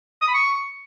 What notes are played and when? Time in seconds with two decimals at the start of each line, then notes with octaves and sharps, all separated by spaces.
0.21 D#6
0.28 B5
0.34 C#6